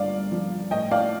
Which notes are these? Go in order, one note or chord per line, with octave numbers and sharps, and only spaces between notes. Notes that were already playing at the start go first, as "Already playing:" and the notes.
Already playing: G1 G2 D5 F5
F3
A2 D#5 G5
D5 F5